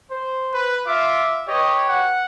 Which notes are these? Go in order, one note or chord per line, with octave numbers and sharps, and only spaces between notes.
C5
B4
F4 E5 F5 D6
G4 B4 C#5 D#5
F#5